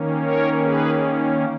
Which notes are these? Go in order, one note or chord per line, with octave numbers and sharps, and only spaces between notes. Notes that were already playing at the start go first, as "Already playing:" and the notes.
Already playing: D#3 A#3 C#4
A#4 C#5
G#4 B4